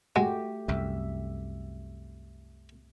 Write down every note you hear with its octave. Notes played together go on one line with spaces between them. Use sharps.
G#3 A3 F#4 G4
C2 F#2 E5